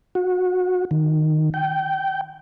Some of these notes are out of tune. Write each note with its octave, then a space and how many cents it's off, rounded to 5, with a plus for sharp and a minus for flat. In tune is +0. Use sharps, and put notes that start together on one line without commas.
F#4 -25
D#3 -10
G5 -20